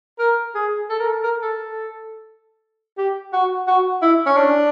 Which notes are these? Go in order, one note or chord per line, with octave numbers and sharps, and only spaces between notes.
A#4
G#4
A4
A#4
A4
A#4
A4
G4
F#4
F#4
E4
C#4
D4